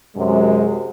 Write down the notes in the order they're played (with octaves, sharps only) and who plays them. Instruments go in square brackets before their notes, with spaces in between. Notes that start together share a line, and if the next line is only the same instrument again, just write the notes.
[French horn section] F#2 C3 G#3